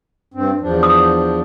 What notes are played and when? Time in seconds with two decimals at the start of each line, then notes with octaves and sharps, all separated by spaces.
0.34 G2 C4
0.61 E2 F3 D4
0.83 D#6